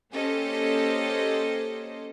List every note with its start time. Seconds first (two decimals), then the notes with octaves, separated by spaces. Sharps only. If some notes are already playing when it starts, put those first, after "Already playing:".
0.12 A#3 C#4 G4 A4 C5 D#5